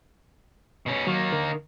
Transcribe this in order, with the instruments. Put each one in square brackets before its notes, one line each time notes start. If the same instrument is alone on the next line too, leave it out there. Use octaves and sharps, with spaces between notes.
[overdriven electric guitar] B2 C#4
[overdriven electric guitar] D#3 A#3 [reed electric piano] F#3
[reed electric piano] D3 A#4